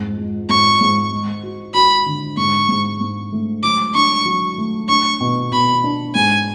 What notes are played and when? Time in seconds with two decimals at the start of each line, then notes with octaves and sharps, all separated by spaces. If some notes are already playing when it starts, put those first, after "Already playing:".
Already playing: F2 G#2
0.17 G#3
0.49 G#2 C#6
0.81 G#2
1.11 G#3
1.43 F#4
1.74 F#4 B5
2.06 D3
2.37 G#2 C#6
2.69 G#2
3.01 G#2
3.32 A3
3.63 F#3 D6
3.94 D4 C#6
4.25 F#3
4.58 A3
4.88 D4 C#6
5.20 B2
5.52 B2 B5
5.84 D4
6.15 G#2 G#5